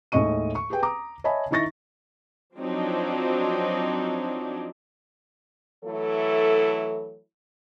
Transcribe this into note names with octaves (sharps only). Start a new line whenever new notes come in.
D#2 A2 G#3 D#5 C#6 D#7
C#6
G4 G#4 B4 G5
A#5 D6 D#6
C#5 D#5 E5 G#5 A5 B5
D#3 D#4 E4 C#6 A6 A#6
F3 F#3 C4 D4 D#4
E3 F#3 A3 E4 A4